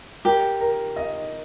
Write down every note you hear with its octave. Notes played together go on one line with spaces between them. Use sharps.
G4 A#4
A#4
D#5